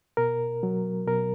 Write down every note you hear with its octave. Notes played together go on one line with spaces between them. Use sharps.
B2 A#4
F#3
B2 A#4